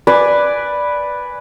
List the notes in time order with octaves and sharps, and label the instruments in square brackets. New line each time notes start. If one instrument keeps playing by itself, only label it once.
[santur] B4 D5 G#5